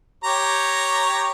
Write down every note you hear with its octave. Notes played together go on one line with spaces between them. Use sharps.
G4 C#5 A#5